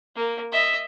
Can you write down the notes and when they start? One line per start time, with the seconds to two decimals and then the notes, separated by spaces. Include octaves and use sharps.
0.15 A#3
0.52 D#5 E5